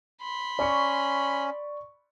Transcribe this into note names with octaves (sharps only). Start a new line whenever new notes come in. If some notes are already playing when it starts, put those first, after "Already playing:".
B5 C6
C#4 D5 C#6